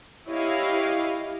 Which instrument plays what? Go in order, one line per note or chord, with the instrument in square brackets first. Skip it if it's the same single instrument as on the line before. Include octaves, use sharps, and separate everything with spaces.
[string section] E4 G4 C#5 D#5 F5